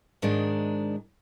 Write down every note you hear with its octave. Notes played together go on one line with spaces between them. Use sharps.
G#2 D#3 G#3 D4